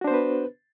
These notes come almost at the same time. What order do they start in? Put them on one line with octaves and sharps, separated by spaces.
F#4 D4 C5 B3 B4